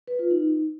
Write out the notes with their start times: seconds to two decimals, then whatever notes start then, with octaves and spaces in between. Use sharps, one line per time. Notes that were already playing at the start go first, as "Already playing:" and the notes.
0.08 B4
0.19 F4
0.31 D#4